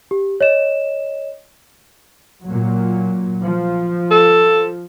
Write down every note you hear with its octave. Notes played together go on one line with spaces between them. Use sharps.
G4
C#5 D#5 E7
A#2 F#3
F3
A4